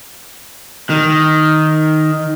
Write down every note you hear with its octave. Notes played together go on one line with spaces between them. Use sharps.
D#3